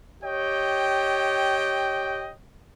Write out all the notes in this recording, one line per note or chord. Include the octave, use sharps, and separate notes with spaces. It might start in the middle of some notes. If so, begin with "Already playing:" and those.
G4 C#5 D#5 G5